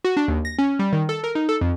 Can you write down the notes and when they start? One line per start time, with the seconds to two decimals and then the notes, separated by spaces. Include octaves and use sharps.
0.04 F#4
0.17 D4
0.28 D#2
0.45 A#6
0.58 C#4
0.79 G3
0.93 D#3
1.09 A4
1.24 A#4
1.35 D#4
1.49 A4
1.61 F2